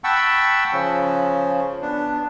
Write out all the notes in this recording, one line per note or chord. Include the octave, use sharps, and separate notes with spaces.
F#5 G5 A5 B5 C#6 E6
C#3 F3 C#4
B3 D4